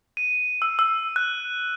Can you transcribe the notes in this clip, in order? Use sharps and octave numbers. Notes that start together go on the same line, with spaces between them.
D#7
E6
E6
F#6